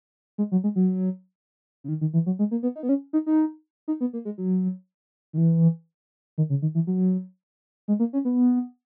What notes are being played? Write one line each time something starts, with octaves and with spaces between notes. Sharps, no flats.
G#3
F#3
G#3
F#3
C#3
D#3
D#3
E3
F#3
G#3
A#3
B3
D#4
B3
C#4
D#4
D#4
D#4
B3
A#3
G#3
F#3
D#3
E3
D#3
C#3
D#3
E3
F#3
G#3
A#3
C#4
B3